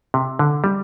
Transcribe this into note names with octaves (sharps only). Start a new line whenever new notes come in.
C3
D3
G3